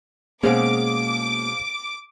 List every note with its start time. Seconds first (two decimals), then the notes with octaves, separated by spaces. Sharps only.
0.43 B2 G#3 A#3 C#4 G#4 C5 F5 D6